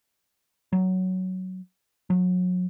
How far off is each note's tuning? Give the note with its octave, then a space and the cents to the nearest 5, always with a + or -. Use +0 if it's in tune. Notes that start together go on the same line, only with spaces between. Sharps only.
F#3 +5
F#3 -30